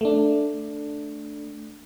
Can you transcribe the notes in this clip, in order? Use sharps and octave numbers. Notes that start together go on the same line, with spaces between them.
A3 D4